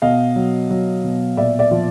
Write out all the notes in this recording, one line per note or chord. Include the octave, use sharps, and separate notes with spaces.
B2 D#5 F5
F#3
F#3
B2
A#2 D5 E5
D5 E5
F3